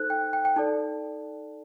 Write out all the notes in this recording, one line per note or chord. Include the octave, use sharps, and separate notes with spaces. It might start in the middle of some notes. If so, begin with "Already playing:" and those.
Already playing: D#4 A4 C5 F#6
G5
G5
G5
D#4 A4 D5 A5